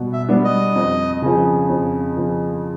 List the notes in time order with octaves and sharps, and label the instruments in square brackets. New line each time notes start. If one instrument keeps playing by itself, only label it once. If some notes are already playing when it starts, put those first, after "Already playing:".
Already playing: [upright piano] B2 G3 B3
[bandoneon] E5
[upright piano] G3 B3 D4
[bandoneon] D#5
[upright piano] F2
C#3 F3
F2
C#3 F3